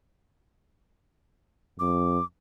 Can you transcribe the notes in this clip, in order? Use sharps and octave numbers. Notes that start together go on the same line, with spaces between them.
F2 D6